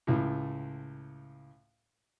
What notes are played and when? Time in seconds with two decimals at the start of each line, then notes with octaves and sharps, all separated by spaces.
0.07 C#2 A2